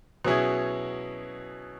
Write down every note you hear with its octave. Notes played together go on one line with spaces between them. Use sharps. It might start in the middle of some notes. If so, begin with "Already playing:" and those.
B2 F#3 C#4 E4 G#4